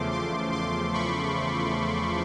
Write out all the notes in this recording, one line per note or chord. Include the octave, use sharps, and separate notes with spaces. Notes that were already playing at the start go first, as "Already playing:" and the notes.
Already playing: E2 C#3 F3 A3 C6 D6
C6 D6
C6 D6
B5 C#6